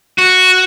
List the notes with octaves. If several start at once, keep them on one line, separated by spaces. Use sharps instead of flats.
F#4